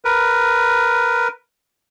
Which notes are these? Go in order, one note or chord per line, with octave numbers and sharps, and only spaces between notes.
A#4 B4